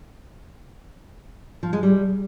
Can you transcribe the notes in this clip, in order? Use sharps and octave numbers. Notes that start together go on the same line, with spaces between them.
F3
G#3
G3